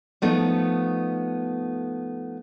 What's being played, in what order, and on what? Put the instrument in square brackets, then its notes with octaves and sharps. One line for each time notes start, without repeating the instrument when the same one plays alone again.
[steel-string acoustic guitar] F3 A3 B3 D#4